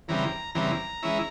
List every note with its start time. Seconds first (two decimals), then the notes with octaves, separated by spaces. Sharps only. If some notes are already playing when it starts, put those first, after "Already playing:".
0.08 E2 C#3 E3 G3 C4 A#5
0.55 E2 C#3 E3 G3 C4 A#5
1.02 E3 G#3 C#4 E4